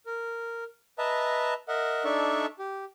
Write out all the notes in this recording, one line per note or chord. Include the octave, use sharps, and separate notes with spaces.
A#4
B4 D#5 E5 A5 A#5
A#4 D#5 E5 F#5
D4 D#4 A4 D5 E5 C#6
G4